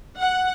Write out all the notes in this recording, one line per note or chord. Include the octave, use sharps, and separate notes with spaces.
F#5